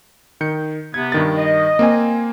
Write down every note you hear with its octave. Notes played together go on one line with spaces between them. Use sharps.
D#3 G6 C#7
C3 B3 G#6
G2 D#3 A6
D#5
A#3 C4 G#5